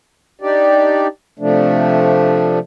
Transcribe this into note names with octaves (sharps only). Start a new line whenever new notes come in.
D4 D#4 G4 D5
C3 F3 A3 D4